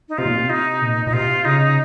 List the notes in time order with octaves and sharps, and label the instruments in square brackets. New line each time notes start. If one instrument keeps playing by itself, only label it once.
[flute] D#4
[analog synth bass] C3 [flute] F4
[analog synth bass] A#2
C3
[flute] D#4
[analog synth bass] A#2
[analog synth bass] A#2 [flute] D#4
[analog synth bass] C3 [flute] F4
[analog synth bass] C#3 [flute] D#4